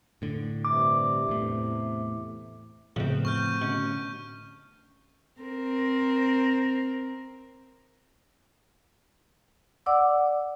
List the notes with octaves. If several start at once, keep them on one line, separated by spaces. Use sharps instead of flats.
A2 D3
G2 C3 D6
E2 A2 C3
F2 A2 C#3 F3 B3 C4
C#6 F6 G6
B2 D3 C#4
C4 A#4
D5 F#5 D6 E6